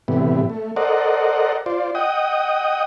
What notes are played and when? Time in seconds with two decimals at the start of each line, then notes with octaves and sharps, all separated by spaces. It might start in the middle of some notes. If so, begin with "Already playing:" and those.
0.08 A2 C3 E3 G3 B3
0.50 A3
0.76 A4 A#4 C5 D5 D#5 F#5
1.66 F4 C5 D5
1.95 D#5 F#5 G5 D#6